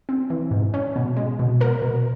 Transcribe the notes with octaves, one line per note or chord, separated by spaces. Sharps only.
C4
E3
G#2
C#4
B2
G#3
B2
B3 A#4
B2